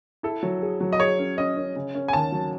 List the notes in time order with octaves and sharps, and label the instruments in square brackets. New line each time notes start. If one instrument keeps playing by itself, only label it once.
[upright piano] E4 [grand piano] A4
[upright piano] F#3
G#4
F#3
[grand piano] D#5
[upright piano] G#4 [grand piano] C#5
[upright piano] C#4
[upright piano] C#4 [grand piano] D#5
[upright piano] C#4
C#3
C#4
[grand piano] G#5
[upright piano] D#2 [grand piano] A5
[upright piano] F#3